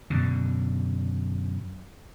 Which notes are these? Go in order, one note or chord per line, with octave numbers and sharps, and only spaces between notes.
F#2 B2 D3